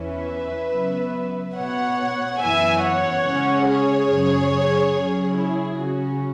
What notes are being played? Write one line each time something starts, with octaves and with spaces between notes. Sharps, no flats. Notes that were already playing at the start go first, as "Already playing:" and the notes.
Already playing: E2 E3 C#4 B4 E5
C#3 F#3 B3
B2 B3 C#5 F#5
F#2 E3 B3 E5 G#5
C#5 F#5
C#3 G#3 C#4
G#4 C#5
F#2 C#3 F#3
C#3 F#3 C#4
E4 G#4
C#3 F#3 C#4 F#4